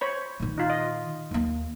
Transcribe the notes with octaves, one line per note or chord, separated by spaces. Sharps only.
C5 C#5 B5
A#2 D#3
D#4 F4
D#5
D#2 A#3